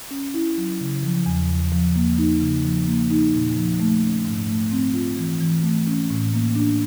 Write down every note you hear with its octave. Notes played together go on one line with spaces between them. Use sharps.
C#4
E4
F#3
C#3
F3
E2
E2
F3
A#3
D#4
C#3
F3
A#3
D#4
A#2
F3
A3
C#4
G#2
A3
C4
F4
E3
E3
A3
C#4
A2
A#3
D4